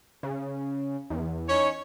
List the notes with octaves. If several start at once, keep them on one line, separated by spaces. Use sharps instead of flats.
C#3
E2
C#4 D#4 C#5